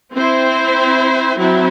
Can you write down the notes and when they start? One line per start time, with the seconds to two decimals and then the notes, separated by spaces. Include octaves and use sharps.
0.15 C4 E4 C5
1.38 F#3 C4 E4